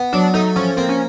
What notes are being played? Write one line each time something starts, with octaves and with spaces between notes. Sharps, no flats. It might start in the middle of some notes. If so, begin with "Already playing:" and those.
Already playing: B3
F#3 D4
A3 D#4
F3 C#4
A#3 C4
C#4